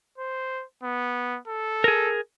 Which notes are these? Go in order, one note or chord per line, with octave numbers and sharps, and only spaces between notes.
C5
B3
A4
G#4 A#4